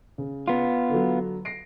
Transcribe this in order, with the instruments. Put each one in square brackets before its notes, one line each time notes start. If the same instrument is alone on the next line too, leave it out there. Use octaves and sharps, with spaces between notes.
[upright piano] C#3
[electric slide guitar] B3 F4
[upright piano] D3 F#3
A#6 C7 D7